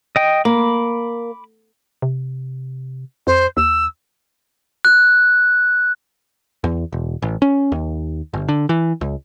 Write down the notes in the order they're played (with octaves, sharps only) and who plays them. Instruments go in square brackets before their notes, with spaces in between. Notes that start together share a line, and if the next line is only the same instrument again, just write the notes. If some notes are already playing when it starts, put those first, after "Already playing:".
[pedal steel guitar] D#5 G5
[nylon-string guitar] A#3 [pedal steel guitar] B5 D6
[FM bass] C3
[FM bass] F2 [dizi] C5
[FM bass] D#2 [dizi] E6
[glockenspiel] F#6
[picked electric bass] E2
E1
A1
C#4
D#2
G1
D3
E3
C#2